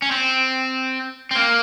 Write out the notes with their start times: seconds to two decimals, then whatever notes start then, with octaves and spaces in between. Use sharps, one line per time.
0.02 C#4
0.11 C4
1.31 C4
1.36 A#3